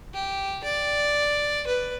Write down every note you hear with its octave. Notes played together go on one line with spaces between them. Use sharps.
G4
D5
B4